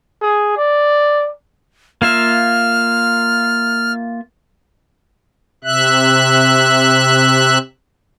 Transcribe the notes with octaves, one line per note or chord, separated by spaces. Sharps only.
G#4
D5
A#3 F4 E5 F6
C3 E5 F#6